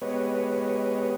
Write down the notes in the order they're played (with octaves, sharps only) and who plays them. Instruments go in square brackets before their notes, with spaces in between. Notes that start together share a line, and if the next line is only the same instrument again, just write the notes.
[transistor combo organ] G#3 B3 G4 B4 C#5 D#5